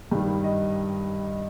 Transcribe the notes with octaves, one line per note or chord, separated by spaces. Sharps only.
G2 D#3 G3
D#5